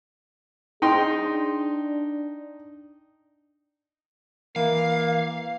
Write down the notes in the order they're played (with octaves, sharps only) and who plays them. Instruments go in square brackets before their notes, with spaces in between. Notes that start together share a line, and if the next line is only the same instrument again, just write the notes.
[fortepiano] D#4 G5 C6 [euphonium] G#4
[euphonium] D4
[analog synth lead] E3 [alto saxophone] A#3 [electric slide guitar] F5